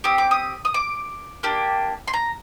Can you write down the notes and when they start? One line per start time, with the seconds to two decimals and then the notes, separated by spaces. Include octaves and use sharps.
0.04 C4 G4 D#6
0.18 D6
0.31 D#6
0.65 D#6
0.74 D6
1.43 A#3 D4 G4
2.08 C6
2.13 A#5